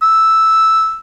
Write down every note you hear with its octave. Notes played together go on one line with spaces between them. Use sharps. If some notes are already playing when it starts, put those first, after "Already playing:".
E6